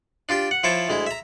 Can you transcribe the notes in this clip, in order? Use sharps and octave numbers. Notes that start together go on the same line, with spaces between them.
D4 F4 G4 G5
F#5
F3 E4 C5 C#5 G5 A5
D2 G#3 E4
E5 A#5